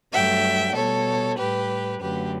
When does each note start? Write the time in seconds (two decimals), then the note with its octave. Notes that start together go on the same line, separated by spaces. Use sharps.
0.13 G2 F#3 A3 E5 G5
0.75 B2 G3 A4 C#5
1.38 A2 G3 G4 B4
2.01 F#2 D3 F#3 A3 G4 B4